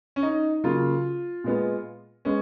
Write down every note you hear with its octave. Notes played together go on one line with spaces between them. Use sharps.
C#4
D#4
C#3 F#3 A#3 F4
A#2 G#3 B3
G#3 B3 C#4